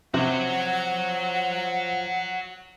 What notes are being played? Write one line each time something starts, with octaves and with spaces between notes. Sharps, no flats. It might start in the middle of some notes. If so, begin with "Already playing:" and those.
C3 F3 F#4 C#5 F#5